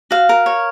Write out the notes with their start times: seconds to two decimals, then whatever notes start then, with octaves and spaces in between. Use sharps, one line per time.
0.11 F#4 F5
0.29 A#4
0.46 C#5